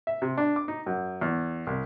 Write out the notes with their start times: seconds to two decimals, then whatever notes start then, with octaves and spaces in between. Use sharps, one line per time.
0.07 E5
0.22 C3
0.38 D4
0.56 D6
0.68 D#4
0.86 F#2
1.21 E2
1.67 C2